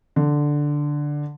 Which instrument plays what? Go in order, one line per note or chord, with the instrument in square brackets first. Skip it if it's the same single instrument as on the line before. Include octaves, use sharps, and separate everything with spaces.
[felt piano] D3